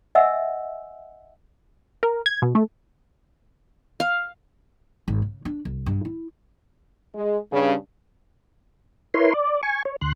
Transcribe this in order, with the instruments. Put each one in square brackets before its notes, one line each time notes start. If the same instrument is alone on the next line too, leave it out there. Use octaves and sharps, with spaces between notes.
[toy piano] D#5 E5 F#5 G#5 E6
[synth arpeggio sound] A#4
G#6
B2
A3
[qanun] F5
[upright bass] G#1
C#3
D4
C2
G2
E4
[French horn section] G#3
G2 C#3
[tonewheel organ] E4 A#4 B4 C#5 C6
D5
G#5 C#6
C#5
D2 C6 F#6